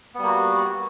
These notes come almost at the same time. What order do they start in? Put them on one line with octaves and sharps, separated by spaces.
B3 G3 A#3 F#4